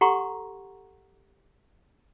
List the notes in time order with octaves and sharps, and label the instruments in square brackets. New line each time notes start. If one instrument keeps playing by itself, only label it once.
[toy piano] G4 A4 F#5 A#5 C6 C#6